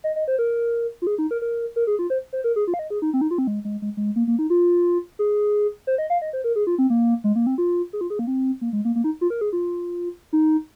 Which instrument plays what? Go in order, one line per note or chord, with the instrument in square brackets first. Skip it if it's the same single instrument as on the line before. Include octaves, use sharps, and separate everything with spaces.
[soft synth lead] D#5
D#5
C5
A#4
F4
G#4
D#4
A#4
A#4
A#4
G#4
F4
C5
C5
A#4
G#4
F4
F5
D#5
G#4
D#4
C4
D#4
F4
C4
G#3
G#3
G#3
G#3
A#3
A#3
D#4
F4
G#4
C5
D#5
F5
D#5
C5
A#4
G#4
F4
C4
A#3
G#3
A#3
C4
F4
G#4
F4
G#4
A#3
C4
A#3
G#3
A#3
A#3
D#4
F4
A#4
G#4
F4
D#4